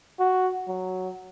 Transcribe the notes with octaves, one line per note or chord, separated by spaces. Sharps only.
F#4
F#3